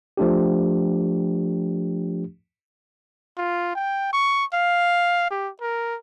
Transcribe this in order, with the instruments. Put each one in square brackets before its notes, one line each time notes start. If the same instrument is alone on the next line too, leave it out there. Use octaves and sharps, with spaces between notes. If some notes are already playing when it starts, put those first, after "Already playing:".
[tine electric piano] F3 A3 D4 G4
[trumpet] F4
G5
C#6
F5
G4
A#4